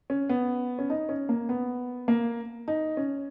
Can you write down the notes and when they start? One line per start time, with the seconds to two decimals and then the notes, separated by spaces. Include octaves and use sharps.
0.10 C#4
0.29 B3
0.79 C#4
0.90 D#4
1.09 C#4
1.29 A#3
1.49 B3
2.08 A#3
2.68 D#4
2.97 C#4